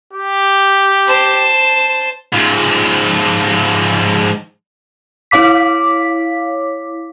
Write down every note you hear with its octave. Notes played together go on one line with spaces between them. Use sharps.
G4
C5 A5
G#2 F3
E4 C#5 F5 D6 B6